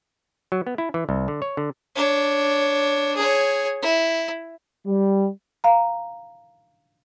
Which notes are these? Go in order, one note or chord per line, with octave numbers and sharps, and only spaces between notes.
F#3
B3
E4
E3
C2
D3
C#5
D3
D4 C#5
G#4 C#5
E4
G3
F5 A#5